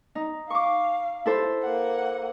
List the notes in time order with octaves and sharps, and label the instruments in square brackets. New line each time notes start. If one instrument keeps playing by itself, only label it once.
[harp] D#4
[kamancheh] F5 [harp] C#6 D6
[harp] E4 A4 C5
[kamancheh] A#3 F#5